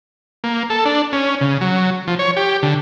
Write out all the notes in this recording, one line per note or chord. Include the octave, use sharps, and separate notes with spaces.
A#3
A4
D4
C#4
C#3
F#3
F3
C#5
G4
D3